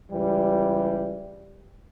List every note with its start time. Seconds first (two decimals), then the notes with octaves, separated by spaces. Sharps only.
0.11 C#2 E3 G3